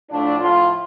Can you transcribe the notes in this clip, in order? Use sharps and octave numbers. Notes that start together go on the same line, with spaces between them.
A2 F3 A3 D4
A2 F3 A3 F4